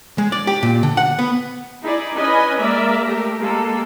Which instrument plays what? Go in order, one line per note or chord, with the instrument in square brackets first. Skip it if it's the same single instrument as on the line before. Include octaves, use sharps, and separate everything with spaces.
[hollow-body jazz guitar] G#3
D5
G4
A#2
D3
F#5
B3
[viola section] D#4 E4 G#4 D5
C#4 B4 D#5 G#5 B5
G#3 A#3 A#4 D5 E5
A3 G4 A#4
G#3 A#3 G4 A4